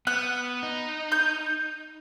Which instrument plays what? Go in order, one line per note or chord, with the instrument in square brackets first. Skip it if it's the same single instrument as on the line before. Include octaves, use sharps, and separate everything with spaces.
[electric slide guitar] B3 [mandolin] F#6
[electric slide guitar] D#4
[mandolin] G6